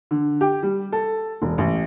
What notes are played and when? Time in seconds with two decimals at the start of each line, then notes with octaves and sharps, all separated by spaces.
0.11 D3
0.41 G4
0.63 G3
0.92 A4
1.42 E1
1.58 A1